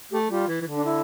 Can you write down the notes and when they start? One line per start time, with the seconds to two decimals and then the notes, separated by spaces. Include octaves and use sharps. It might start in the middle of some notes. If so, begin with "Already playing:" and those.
0.11 A3 G4
0.30 G3 F4
0.48 E3
0.62 E3
0.67 D3
0.75 D4
0.85 E4